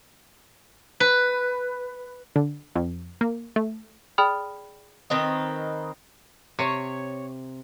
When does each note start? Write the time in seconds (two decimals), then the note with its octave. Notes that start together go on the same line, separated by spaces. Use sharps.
1.00 B4
2.36 D3
2.76 F2
3.21 A#3
3.56 A3
4.18 G#4 D5 G5 B5 D#6 F6
5.10 D#3 C4 B4 D#5
6.59 C3 C#5